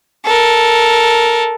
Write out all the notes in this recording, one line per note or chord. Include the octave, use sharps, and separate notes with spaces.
A4 A#4